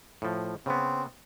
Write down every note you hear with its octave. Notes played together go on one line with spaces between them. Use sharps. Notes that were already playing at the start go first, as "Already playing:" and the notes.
A2 F3
C#3 B3 C4